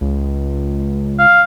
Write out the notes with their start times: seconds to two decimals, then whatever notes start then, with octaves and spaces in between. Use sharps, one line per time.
0.01 C#2
1.19 F5